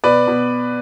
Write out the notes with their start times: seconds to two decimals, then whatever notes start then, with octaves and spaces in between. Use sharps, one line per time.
0.04 B2 B4 D5
0.27 B2